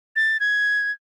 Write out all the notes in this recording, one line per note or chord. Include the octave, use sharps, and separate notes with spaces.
A6
G#6